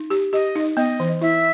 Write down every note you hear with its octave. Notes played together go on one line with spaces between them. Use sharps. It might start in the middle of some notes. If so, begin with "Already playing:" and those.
Already playing: D#4
G4
G4 D#5
D#4
B3 D#5
E3
E4 E5